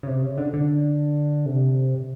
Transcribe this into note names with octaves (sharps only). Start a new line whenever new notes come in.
C#3
C3
C#3
D3
D3
C3